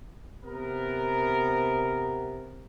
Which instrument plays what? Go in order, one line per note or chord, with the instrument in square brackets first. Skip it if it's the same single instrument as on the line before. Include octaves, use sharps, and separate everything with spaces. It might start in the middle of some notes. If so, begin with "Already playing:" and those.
[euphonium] C3 [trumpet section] B3 A#4